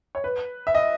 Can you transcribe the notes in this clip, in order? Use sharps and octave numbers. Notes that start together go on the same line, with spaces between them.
C#5
B4
E5
D#5